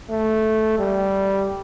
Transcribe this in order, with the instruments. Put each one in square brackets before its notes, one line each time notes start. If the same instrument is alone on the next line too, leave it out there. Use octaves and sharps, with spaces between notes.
[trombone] A3
G3